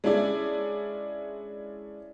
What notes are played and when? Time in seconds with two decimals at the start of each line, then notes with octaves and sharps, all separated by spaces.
0.04 G#3 C#4 D4 E4 G#4 D5